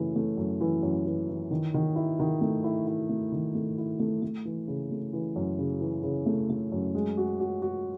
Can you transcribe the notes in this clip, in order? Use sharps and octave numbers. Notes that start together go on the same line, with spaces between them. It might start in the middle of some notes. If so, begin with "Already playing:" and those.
Already playing: F#2 C#3 E3 A3
A3
F#2
E3
F#2
E3
E3
D#3
D#3
E4
D#3
A3
E4
E4
A3
D#3
A3
E4
A3
A3
E3
C#3
A3
E3
F#2
C#3
E3
C#3
A3
A3
F#2
G#3
F#4
F#4
F#4